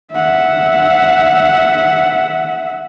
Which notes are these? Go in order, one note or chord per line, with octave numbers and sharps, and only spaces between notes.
E5 F#5